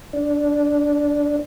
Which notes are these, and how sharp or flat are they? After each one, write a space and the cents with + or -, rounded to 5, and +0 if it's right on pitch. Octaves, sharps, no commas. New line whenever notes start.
D4 -10